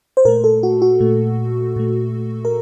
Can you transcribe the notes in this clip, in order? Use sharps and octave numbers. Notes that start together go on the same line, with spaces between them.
C5
A#2 A3 A#4
A4
F#4
F#4
A#2 A3
A#2 A3
A#4